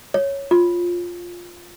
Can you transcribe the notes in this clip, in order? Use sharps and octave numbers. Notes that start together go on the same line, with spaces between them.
C#5
F4